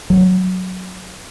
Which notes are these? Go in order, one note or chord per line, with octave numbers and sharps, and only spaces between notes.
F#3